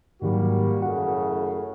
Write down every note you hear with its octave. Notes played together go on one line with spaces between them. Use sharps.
G#2 D#3 F#3 G3 A#3 F#4
F#2 A2 C#3 F#5